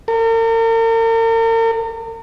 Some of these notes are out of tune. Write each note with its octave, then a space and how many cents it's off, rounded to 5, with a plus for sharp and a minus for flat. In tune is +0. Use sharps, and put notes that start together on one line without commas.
A#4 -40